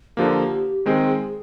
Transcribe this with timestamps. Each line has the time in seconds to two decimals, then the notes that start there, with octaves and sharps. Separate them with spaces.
0.17 D3 F3 A#3 G4
0.86 D#3 G#3 C4 G#4